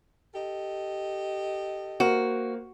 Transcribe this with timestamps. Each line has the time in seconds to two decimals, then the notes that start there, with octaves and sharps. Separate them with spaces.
0.35 G4 A4 D#5
2.00 A#3 F#4 A#4 C5